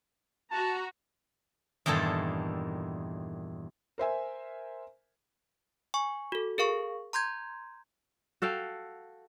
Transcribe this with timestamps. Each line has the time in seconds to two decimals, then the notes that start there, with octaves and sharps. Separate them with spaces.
0.51 F#4 A5 A#5
1.86 E2 G2 A#2 D#3 A4 A5
3.98 A#4 C5 E5 G#5
5.94 G#5 C#6
6.32 F#4 A4
6.58 G#4 A#4 F5 C#6
7.13 A#5 C6 G6 G#6
8.42 F#4 A4 F5 G5